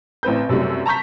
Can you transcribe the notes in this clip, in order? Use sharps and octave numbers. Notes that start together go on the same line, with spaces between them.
A1 C4 B4 G6
F#2 C3 F#3 G3 A3
A5 A#5 C#6 G6 B6